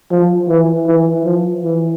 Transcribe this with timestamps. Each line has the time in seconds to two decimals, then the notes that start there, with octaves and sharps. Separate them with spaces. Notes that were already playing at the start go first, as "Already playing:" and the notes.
0.11 F3
0.49 E3
0.87 E3
1.24 F3
1.62 E3